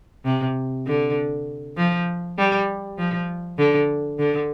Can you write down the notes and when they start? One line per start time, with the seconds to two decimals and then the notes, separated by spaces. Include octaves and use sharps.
0.25 C3
0.86 D3
1.77 F3
2.38 G3
2.98 F3
3.58 D3
4.18 D3